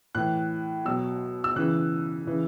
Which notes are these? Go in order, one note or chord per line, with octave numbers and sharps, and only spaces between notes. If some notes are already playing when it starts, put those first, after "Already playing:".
A2 E3 F#6
B2 F#3 E6
E6
C#3 E3 F#6
C#3 E3